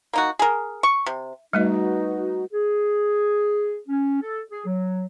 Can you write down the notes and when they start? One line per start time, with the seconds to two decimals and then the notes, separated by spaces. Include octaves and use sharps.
0.13 A#3 D#4 F#4
0.39 G#4 A#4
0.83 C#6
1.06 C3
1.53 G3 A3 D#4 F#4 B4 D#5
2.52 G#4
3.88 C#4
4.22 A4
4.51 G#4
4.65 F#3